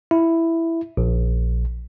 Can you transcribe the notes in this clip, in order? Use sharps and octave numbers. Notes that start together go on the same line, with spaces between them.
E4
A#1